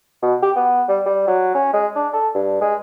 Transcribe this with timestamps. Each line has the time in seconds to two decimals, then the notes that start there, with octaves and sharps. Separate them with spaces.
0.22 B2
0.42 G4
0.56 B3
0.89 G3
1.06 G3
1.27 F#3
1.54 C#4
1.73 G#3
1.96 D4
2.13 A4
2.35 G2
2.61 G#3